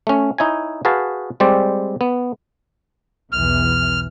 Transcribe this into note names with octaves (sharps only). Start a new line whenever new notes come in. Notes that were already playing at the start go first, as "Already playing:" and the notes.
A3 C#4
D#4 E4 C#5 G#5
F#4 G#4 B4 F5 A5
G3 G#3 C4 C5 D5
B3
B1 E2 E3 F6